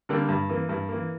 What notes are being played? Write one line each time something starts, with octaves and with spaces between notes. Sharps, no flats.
D3 G3 A#3 D4
G2
E3 A#3
G2
E3 A#3